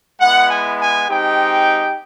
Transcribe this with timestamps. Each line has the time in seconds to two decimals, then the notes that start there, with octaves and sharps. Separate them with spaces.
0.20 G#3 B3 E4 F#5
0.50 G#5
0.79 G#5
1.08 G#3 C4 D#4 G4 G5